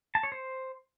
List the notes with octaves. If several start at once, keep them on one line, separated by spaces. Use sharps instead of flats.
A5
C#5
C5